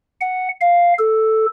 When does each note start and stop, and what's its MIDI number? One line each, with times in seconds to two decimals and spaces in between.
0.21 0.49 78
0.61 0.94 77
0.99 1.46 69